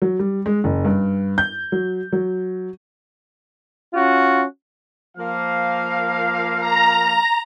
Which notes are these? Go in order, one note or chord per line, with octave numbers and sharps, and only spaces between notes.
F#3
G3
G#3
F#1
G2
G6
F#3
F#3
C#4 F4 F#4
F3 A#3 F5
A#5